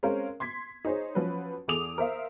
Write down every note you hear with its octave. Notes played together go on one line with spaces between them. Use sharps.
G#3 C4 C#4 A#4 C5 F5
C6 G#6 B6
D#4 G#4 C5 C#5
F3 F#3 C#4 B4
E2 G#4 A4 D6 D#6 F7
A#4 C5 E5 F5